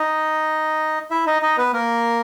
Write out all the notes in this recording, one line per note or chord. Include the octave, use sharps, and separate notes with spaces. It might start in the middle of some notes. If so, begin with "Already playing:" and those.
Already playing: D#4 D#5
E4 E5
D#4 D#5
D#4 D#5
B3 B4
A#3 A#4